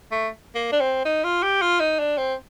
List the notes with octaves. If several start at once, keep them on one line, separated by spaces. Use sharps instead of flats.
A3
A#3
D4
C4
D#4
F4
G4
F4
D#4
D4
C4